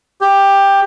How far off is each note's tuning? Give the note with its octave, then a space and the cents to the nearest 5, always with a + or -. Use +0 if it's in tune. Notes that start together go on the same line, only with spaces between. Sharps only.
G4 +10